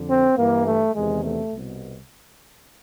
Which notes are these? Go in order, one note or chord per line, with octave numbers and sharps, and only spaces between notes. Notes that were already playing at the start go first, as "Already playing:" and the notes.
Already playing: F2 D3
C4
G2 E3 A#3
A3
E2 C3 D#3 G#3
A3
C2 B2